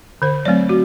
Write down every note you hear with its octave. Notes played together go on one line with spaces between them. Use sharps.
D3 C5
F#3 A3 C4 D5
F#4